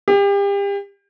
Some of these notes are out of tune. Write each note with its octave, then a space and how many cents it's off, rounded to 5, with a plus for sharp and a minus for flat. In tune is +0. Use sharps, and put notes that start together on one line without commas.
G4 +35